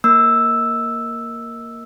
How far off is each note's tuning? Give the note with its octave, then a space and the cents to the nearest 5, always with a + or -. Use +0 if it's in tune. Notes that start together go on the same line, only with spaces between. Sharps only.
A#3 +0 E6 +0